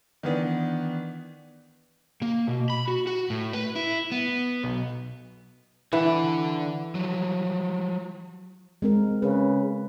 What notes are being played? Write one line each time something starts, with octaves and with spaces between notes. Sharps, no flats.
D#3 E3 B3 D4
A#3
B2
B5
F#4
F#4
A2
B4
E4
B3
B1
D3 E3 F#5
F3 F#3
G#3 C4 A#4
C#3 B4